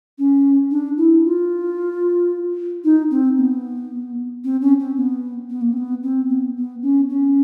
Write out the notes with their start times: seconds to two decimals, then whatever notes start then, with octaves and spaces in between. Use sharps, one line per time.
0.19 C#4
0.71 D4
0.97 E4
1.25 F4
2.84 D#4
3.11 C4
3.38 B3
4.44 C4
4.61 C#4
4.80 C4
4.97 B3
5.50 B3
5.61 A#3
5.73 C4
5.77 B3
6.03 C4
6.29 B3
6.57 B3
6.82 C#4
7.10 C#4